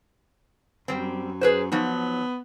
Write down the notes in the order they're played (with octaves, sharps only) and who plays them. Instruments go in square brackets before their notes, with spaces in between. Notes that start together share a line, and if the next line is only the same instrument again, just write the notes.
[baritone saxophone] F#2 [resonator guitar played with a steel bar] G3 C4
[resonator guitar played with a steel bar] G#4 B4 C5
[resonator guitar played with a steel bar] F3 F#3 D#4 [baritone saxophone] B3